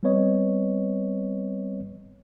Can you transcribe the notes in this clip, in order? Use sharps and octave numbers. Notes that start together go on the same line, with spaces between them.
G3 B3 C4 B4 C#5 D#5